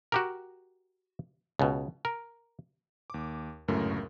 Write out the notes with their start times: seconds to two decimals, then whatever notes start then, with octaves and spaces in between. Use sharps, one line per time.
0.12 F#4 G4 A#4
1.59 C#2 B2
2.05 A#4
3.10 D#2 D6
3.68 G1 C#2 F#2 A2 A3 A#4